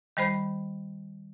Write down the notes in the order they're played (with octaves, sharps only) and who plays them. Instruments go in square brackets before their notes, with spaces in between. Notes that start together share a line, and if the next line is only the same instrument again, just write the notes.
[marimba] D#3 G3 C5 B5